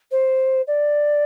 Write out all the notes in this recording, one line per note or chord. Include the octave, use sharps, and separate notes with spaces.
C5
D5